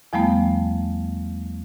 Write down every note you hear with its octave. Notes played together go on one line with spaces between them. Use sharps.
E2 F3 G3 A3 B3